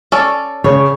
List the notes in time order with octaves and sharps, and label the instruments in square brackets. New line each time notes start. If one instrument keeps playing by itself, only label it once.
[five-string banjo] C#4 A4 D5
[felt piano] C#3 [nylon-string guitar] C#5